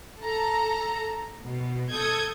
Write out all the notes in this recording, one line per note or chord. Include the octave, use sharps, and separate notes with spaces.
A4 A#5
B2
A4 D#6 G6 G#6